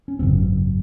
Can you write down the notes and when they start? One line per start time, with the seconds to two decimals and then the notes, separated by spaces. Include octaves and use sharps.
0.08 C#4
0.19 G#1 F#2 C#3 C4